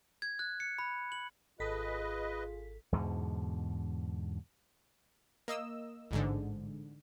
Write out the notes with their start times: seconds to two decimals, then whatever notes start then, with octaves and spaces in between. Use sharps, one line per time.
0.22 G#6
0.39 F#6
0.60 C#7
0.78 B5
1.12 F#7
1.60 G#1 F4 G#4 A4 B4 D#5 B6
2.92 E2 G#2 B2 D3
5.48 A#3 D#5 E6
6.11 A1 G#2 D3